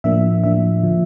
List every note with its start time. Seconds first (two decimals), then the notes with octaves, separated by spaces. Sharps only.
0.04 A2 F3 A#3 D4 E5
0.44 A2 F3 A#3 D4 E5
0.84 D3 F3